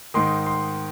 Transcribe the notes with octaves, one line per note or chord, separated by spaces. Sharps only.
G#2 D#3 C6
C6